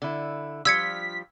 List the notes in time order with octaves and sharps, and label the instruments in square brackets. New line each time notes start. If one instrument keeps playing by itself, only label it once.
[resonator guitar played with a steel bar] D3 E4
[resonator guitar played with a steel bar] F3 G3 F4 [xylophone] E6 G#6 C#7 [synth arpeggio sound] B6